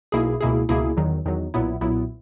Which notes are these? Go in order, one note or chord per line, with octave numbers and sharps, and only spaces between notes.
B1 B2 A#3 E4 G#4
C#2 B2 A#3 E4 G#4
C#2 B2 A#3 E4 G#4
E2 D#3 F#3
E2 D#3 F#3
B1 A#2 F#3 B3 E4
B1 A#2 F#3 B3 E4